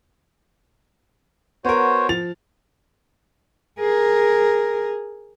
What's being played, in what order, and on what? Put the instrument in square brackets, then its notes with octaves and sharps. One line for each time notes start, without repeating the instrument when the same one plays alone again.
[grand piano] B3 A#4 [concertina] F#4 C5 C#5
[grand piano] F3 A6 F7
[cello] G#4 A#4